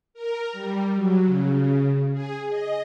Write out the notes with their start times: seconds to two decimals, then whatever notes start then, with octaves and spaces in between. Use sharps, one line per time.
0.14 A#4
0.53 G3
0.95 F#3
1.26 C#3
2.12 G#4
2.50 D#5